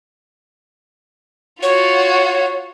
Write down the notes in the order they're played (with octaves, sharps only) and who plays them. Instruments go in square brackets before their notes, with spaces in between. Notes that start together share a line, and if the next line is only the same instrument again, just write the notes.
[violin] F4 F#4 [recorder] C#5